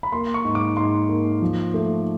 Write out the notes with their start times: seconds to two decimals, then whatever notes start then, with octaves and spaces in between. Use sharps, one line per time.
0.03 B5
0.12 A#3 C6
0.34 C#6
0.45 G#2
0.55 D6
0.77 G#2 C6
1.09 A#3
1.42 F3
1.74 A3